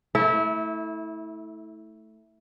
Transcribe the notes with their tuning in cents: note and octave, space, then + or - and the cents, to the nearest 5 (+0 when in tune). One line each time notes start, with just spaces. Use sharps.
A3 +0 E4 -25